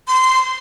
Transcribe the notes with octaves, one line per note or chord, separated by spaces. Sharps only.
C6